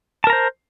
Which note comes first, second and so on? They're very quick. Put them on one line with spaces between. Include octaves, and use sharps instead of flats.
A5 A#4 A#5 C5